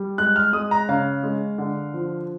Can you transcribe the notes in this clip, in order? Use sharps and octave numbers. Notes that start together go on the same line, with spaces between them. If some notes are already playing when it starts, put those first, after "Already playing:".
Already playing: G3
G#3 F#6
F6
G#3 D#6
A#5
C#3 F5
G#3
D3
F3